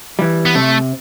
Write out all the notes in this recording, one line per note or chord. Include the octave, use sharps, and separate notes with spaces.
E3 G3
B3
C3 A3